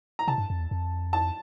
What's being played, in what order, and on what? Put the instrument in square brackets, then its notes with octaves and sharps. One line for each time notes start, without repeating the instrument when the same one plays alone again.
[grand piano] A#5
[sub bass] C3 [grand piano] A5
[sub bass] G2
F2
E2
F2
[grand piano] A5